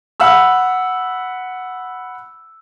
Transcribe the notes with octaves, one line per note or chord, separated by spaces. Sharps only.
F#5 B5 E6 F6